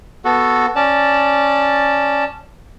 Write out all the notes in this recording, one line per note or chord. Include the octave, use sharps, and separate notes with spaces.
B3 F#4 A4
C#4 D5 A5